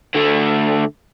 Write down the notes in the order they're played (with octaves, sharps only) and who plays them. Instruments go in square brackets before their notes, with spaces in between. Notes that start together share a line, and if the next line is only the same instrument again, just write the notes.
[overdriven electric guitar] D3 A3